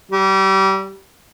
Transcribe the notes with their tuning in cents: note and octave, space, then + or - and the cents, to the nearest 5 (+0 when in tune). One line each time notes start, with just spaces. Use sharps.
G3 -30